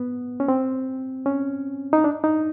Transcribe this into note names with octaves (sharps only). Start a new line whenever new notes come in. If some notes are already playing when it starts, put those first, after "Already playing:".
Already playing: B3
C#4
C4
C#4
D#4
D4
D#4